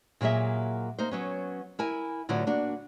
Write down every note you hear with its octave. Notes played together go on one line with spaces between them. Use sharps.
A#2 F#3 A#3 G#4 E5
A#3 D#4 C5
F#3 B3 C#4
E4 A#4 G#5
A2 D3 F#3 B3 F4 F#4
A#3 D4 F#4